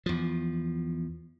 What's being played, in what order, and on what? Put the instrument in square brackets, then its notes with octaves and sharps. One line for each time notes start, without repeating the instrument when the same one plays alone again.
[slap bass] E2 F3